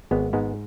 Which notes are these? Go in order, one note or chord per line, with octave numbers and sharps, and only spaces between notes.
G#1 G#3 B3
G#2 G#3 B3